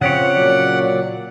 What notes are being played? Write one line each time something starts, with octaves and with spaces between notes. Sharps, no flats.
C#3 F3 C4 G4 C#5 F#5
A#2 F#3 D5